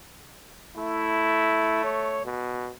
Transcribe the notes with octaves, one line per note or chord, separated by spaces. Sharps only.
A3 E4
C#5
B2